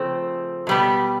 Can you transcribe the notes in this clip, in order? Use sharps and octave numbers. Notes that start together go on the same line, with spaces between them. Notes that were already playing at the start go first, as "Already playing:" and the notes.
Already playing: C#3 F3 A3 C4
B2 G3 B3